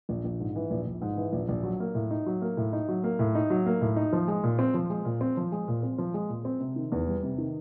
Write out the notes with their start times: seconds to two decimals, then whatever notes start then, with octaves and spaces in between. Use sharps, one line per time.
0.09 A#1
0.24 A#1
0.40 G#2
0.55 E3
0.71 A#1
0.87 A#1
1.02 G#2
1.17 E3
1.33 A#1
1.49 A#1
1.63 F#3
1.80 A#3
1.95 A2
2.11 D#4
2.26 F#3
2.42 A#3
2.57 A2
2.73 D#4
2.88 F#3
3.04 A#3
3.19 A2
3.35 D#4
3.50 F#3
3.66 A#3
3.81 A2
3.96 D#4
4.13 F3
4.28 G#3
4.43 A#2
4.59 C4
4.74 F3
4.90 G#3
5.05 A#2
5.21 C4
5.37 F3
5.52 G#3
5.68 A#2
5.83 C4
5.98 F3
6.14 G#3
6.29 A#2
6.45 C4
6.60 C3
6.76 D#3
6.92 E2
7.07 G3
7.23 C3
7.38 D#3